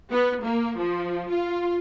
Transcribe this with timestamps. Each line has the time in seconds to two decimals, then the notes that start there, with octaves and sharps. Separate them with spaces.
0.11 B3
0.44 A#3
0.79 F3
1.31 F4